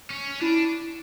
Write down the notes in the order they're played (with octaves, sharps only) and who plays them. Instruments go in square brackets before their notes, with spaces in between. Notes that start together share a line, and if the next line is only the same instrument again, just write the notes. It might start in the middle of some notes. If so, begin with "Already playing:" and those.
[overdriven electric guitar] C#4
[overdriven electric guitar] D4 [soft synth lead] E4